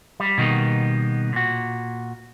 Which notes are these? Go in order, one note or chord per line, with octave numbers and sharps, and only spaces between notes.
G3
B2 D#3 G3 A#3 B3
A#2 F#4